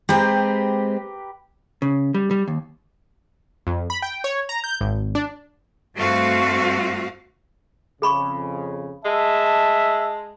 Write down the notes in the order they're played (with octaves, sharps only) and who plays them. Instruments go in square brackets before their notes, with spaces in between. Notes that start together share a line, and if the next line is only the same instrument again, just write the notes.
[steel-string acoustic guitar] G#3 C4 [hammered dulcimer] G4 B4 A#5
[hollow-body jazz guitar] C#3
G3
G3
D#2
[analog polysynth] F2
B5
G5
C#5
A#5
G6
G#1
D4
[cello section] G2 A3 C4 F#4 F5
[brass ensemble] F2 C#3 [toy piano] G#4 B5 C#6
[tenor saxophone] G#3 [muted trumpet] E5 [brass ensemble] A5